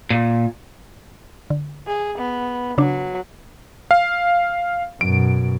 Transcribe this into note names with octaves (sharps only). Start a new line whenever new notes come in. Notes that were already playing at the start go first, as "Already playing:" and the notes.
A#2
D3
G#4
B3
C#3 F#3 D4
F5
F#2 B2 D7